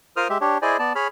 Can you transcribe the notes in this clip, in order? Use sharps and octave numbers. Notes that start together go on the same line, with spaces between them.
F4 A#4 C5 D#6 F6
G#3 G4 E5
D4 G4 C#5
E4 G#4 C5 D5 D#5 G#5
B3 D5 A5
G#4 C#5 B5 F6